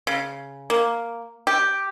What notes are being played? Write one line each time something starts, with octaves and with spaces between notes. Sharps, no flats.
C#3
A#3
G4